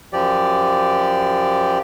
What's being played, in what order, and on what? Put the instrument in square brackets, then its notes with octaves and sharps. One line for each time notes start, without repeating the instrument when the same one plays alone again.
[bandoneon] F#2 F3 G4 D5